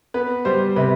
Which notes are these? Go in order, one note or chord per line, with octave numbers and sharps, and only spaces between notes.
B3 B4
G3 C5
C3 B4